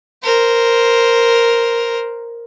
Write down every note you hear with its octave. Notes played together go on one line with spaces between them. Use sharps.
A#4 C5